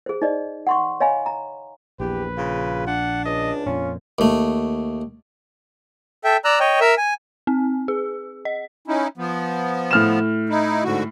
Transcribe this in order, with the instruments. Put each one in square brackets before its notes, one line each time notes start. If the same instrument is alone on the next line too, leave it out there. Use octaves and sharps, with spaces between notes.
[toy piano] G#4 C5
D#4 C5 D5 D#5
F#5 C6 C#6
C#5 D#5 F5 G#5 B5
A#5
[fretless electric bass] A#1 [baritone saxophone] E2 [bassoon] G4 [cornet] B4
[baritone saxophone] C#3 [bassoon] F4
[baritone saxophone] D4 [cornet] F#5
[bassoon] C#2 [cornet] D#5
[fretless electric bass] F2 A#2 [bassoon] C#4 [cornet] F4
[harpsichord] D#2 A3
[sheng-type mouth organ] A4 E5 G5
D5 A#5 E6 F#6
C#5 D#5 G5
A#4 E5 E6
G#5
[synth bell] C4
G#4
D#5
[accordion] C#4 D#4 E4
F3 B3
[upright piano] A2 F6 E7
[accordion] D#4 E4
G#2 D3 F#4